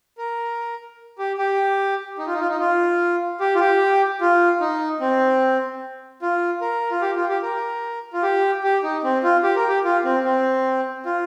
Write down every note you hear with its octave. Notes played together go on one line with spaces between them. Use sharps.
A#4
G4
G4
D#4
F4
D#4
F4
D#4
F4
G4
F4
G4
F4
D#4
C4
F4
A#4
F4
G4
F4
G4
A#4
F4
G4
G4
D#4
C4
F4
G4
A#4
G4
F4
C4
C4
F4